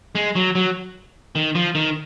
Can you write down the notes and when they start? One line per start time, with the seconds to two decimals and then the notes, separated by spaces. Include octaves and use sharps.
0.15 G#3
0.36 F#3
0.55 F#3
1.36 D#3
1.55 F3
1.75 D#3